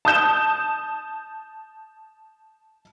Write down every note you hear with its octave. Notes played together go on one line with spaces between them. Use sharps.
A5 D#6 G6 E7